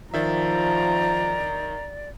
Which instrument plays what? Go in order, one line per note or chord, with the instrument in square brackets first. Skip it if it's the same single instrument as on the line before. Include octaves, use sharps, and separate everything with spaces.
[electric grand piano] D#3 E5 [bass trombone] F3 [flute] D5 [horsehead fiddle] A#5